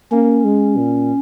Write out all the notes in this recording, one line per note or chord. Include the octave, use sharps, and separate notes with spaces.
A#3 C#4
G#3
A#2